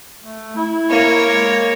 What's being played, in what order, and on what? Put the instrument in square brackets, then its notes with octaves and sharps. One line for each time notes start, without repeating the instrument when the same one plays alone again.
[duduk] A3
E4
[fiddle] A#3 C#5
[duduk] G#3